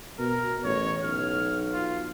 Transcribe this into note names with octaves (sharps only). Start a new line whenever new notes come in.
B2 A#4
A1 C#5
B1 F6
F4